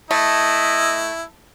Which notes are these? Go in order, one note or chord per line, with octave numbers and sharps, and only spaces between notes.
A3 E4 D#5